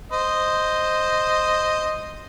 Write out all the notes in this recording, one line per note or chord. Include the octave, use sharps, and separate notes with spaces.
C5 D#5